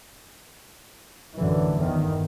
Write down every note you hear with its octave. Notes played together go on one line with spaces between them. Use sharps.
A1 F#2 D3 E3
G1 E2 D#3